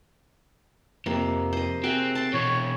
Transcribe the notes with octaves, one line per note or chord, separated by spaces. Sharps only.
F2 C3 A#3 C6
C5 D#5
C4 F#4 G#4 E5
A5 C6
B2 E3 C#5